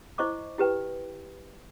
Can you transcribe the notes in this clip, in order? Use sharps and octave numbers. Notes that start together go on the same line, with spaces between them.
E4 C5 D#5 C#6 D6
E4 G4 B4 G5